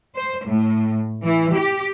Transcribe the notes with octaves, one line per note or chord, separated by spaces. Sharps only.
C5
A2
E3
G4